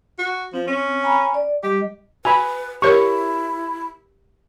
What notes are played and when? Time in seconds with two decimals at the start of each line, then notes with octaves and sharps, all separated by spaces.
0.19 F#4
0.53 F3 C4
0.67 C#4
1.03 G#5 A#5 B5
1.34 D5
1.63 G3 G4 D#5
2.25 F#4 B4 G#5 B5
2.82 E4 G4 A#4 C#5 C#6